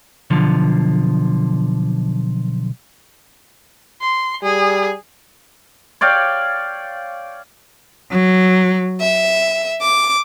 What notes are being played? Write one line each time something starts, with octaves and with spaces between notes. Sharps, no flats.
B1 D3 F3
C6
G3 G#4
C#5 D5 F5 G5
F#3
E5
D6